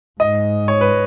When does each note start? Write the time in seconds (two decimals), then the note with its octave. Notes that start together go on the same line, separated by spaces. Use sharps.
0.20 G#2 D#5
0.68 C#5
0.81 B4